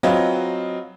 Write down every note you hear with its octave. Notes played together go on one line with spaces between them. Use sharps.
F#3 C4 F4 B4 D#5